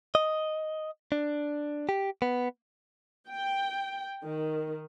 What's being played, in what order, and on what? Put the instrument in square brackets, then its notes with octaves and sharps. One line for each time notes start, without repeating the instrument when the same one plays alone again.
[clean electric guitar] D#5
D4
G4
B3
[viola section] G5
D#3